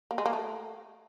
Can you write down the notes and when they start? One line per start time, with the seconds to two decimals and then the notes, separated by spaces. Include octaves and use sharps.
0.11 A#3
0.18 G#3
0.26 A#3
0.33 A3